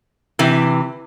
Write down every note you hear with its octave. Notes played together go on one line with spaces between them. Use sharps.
C3 E3